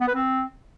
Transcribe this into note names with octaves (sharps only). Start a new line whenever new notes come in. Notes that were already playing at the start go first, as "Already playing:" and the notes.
B3
B4
C4